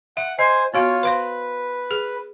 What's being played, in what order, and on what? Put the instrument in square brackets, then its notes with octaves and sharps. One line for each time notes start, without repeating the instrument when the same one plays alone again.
[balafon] E5 [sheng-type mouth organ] F#5
[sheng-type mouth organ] C5 G#5 [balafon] D#5
[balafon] B3 F#4 F5 [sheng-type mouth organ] F4 C#5
[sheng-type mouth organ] B4 [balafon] C5 F5 C6
[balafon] G#4